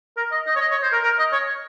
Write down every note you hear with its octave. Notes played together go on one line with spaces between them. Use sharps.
A#4
D#5
D#5
C#5
D#5
C#5
C5
A#4
A#4
D#5
C#5